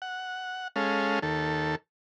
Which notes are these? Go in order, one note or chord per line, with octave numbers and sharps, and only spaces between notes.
F#5
G#3 C#4 A4 F5
D#2 A4